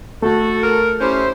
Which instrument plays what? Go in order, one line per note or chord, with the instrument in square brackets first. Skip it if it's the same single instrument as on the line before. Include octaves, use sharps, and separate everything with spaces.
[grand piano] A3 [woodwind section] F#4 A4
[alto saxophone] A#4
[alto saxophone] C#4 [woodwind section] E4 G4 C5